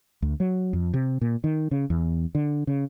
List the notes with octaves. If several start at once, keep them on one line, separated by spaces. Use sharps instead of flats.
D2
F#3
F2
C3
A#2
D#3
C#3
E2
D3
C#3